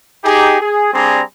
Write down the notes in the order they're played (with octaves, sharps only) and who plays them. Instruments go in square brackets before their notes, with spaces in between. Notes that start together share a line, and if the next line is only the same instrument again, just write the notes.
[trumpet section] D#4 G4 G#4
G#4
G3 C4 D4 G#4 A#5 C6